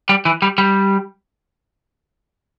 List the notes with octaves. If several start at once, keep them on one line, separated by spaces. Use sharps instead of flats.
G3
E3
G3
G3